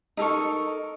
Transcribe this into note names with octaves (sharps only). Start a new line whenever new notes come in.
D#4 A4 A#4 C#6